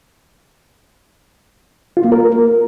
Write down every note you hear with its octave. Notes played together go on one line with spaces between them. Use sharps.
F4
A#3
A#4